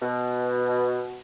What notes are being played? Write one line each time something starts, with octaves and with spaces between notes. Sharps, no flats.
B2